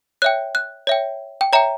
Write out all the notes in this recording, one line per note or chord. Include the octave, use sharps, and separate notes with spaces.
C#5 E5 G5 F#6
F#6
C#5 E5 G5
G5
C#5 E5 G5 A#5